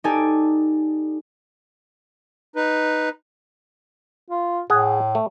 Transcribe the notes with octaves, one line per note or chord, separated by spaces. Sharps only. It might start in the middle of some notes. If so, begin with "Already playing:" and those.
D#4 G4 A4 D5 G#5 A5
D#4 B4
F4
A2 G#4 F#5
A3